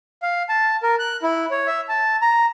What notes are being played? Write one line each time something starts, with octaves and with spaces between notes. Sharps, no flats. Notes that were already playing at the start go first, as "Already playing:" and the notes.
F5
A5
A#4
F#6
E4
C#5
E5
A5
A#5